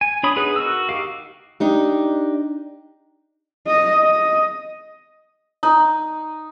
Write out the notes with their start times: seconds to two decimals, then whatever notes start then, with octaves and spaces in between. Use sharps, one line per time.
0.01 G#5
0.23 D4 C#5 B5 D#6
0.36 B3 D#4 G#4 B4
0.56 F#4 A#4 E6
0.89 D#4 G4 F5
1.60 D4 D#4 G4
3.67 D#5
4.03 D#5
5.63 D#4